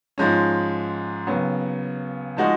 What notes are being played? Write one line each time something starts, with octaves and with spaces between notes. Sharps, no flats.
G#2 F3 G#3 C#4
D#2 C#3 F#3 B3
F3 G#3 D#4 F#4